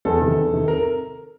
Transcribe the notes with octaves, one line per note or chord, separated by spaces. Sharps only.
E2 A4
C3 D#3
E2
C3 D#3
A#4